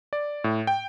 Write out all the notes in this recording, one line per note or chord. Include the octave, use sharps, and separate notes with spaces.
D5
A2
G5